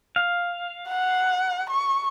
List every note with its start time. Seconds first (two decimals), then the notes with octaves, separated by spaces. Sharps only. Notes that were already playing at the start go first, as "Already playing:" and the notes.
0.16 F5
0.88 F#5
1.70 C#6